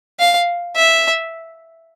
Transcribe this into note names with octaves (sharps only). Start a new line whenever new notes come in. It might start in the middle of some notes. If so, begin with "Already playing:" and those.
F5
E5